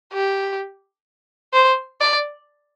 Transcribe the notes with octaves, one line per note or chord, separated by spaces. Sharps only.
G4
C5
D5